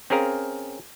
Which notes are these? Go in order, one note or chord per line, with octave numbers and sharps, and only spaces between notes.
C4 C#4 G#4 A#4 F5